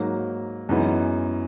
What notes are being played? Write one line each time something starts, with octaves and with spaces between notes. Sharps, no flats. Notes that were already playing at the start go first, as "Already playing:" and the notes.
Already playing: G#2 F#3 A#3 D#4
F#2 E3 G#3 B3 D#4